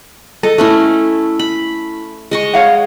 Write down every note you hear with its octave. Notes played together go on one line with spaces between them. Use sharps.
A4 D#5
A3 C#4 E4
B5
G#3 D#5 C#6
C#5 F5 F#5